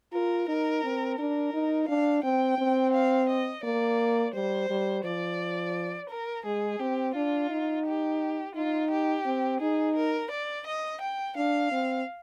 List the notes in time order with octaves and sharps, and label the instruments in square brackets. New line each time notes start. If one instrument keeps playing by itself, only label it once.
[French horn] F4 [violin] A#4
[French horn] D#4 [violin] A#4
[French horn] C4
[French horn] D4 [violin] A#4
[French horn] D#4
[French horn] D4 [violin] F5
[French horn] C4 [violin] G5
[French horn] C4
[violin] F5
D#5
[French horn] A#3 [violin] D5
[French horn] G3 [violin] C5
[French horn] G3
[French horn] F3 [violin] D5
[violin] A#4
[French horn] G#3 [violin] G#4
[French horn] C4 [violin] G4
[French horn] D4 [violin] F4
[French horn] D#4
[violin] G4
[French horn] D#4 [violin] F4
[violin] G4
[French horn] C4
[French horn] D#4 [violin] G#4
[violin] A#4
D5
D#5
G5
[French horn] D4 [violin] F5
[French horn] C4